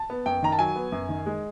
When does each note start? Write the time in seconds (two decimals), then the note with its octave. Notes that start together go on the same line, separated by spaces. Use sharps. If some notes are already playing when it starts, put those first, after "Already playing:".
Already playing: A5
0.10 B3
0.26 F#2 G5
0.43 D#3 A#5
0.52 A5
0.59 F#3 G#5
0.76 B3
0.92 F#2
1.09 D#3
1.26 G#3